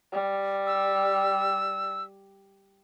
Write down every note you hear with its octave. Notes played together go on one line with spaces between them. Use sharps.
G3
E6